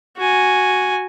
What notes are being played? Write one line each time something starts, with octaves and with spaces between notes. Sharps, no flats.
F#4 G#5